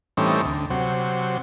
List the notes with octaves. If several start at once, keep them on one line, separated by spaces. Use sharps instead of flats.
A2 E3 G3 C4 C#4 D#4
D2
C3 F#3